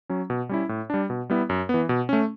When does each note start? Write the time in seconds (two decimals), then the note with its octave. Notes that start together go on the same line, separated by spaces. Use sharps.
0.09 F#3 C#4
0.30 B2
0.49 G3 C#4 E4
0.69 A2
0.90 G3 D4
1.10 B2
1.30 G3 B3 E4
1.49 F#2
1.69 E3 B3
1.89 B2
2.09 A3 C#4